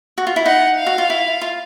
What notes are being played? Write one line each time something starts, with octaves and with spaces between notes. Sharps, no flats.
F#4
F4
E4
D#4 F#5
F5
F#4
F4
E4
F4